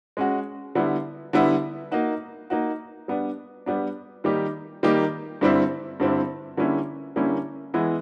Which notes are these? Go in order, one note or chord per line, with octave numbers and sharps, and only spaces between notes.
G#3 C#4 F#4
D3 G3 B3 E4
D3 G3 B3 E4
A#3 D#4 F#4
A#3 D#4 F#4
G3 B3 D4
G3 B3 D4
D#3 G3 A#3 D#4 G4
D#3 G3 A#3 D#4 G4
G2 D3 G3 C4 E4
G2 D3 G3 C4 E4
D3 G3 A#3 C#4 E4
D3 G3 A#3 C#4 E4
E3 G#3 B3 E4